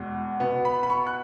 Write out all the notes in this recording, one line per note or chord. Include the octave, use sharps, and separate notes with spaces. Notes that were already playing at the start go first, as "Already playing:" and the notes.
Already playing: E2 B2 G#3
B2 B3
B5
B5
C#6
F#6